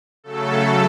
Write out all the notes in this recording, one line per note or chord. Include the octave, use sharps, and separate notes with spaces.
C#3 F#3 A3 A4